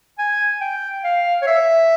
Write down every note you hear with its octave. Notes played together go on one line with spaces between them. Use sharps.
G#5
G5
F5
C#5
E5